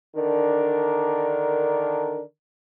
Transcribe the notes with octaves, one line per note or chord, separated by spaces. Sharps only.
D3 D#3 D4 A#4